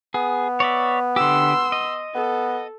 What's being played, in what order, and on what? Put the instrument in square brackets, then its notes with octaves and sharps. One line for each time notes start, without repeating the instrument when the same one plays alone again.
[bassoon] B3 [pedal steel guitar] G#4
[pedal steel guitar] C#5 D5 E5
[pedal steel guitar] D3 G4 [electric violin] C6 E6
[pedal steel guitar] D#5
[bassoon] B3 [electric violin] A4